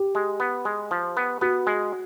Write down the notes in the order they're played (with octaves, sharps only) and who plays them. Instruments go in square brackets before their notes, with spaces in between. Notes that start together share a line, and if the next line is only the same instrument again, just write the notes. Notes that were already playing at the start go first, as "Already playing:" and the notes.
Already playing: [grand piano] G4
[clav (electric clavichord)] G#3
B3
G#3
F3
B3
[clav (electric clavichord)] B3 [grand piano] F#4
[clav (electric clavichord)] G#3